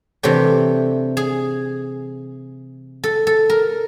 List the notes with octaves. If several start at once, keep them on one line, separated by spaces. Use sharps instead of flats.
C3 E3 A3 D4 G4
G#4
A4
A4
A#4